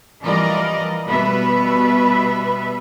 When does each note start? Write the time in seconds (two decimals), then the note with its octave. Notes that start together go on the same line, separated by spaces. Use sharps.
0.21 E3 F3 G3 A#4 D5 D#5
1.09 B2 G3 B3 B4 E5